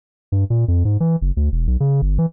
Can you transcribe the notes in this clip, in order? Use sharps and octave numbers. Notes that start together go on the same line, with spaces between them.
G2
A#2
F2
G#2
E3
F#1
D2
E1
B1
C#3
G1
E3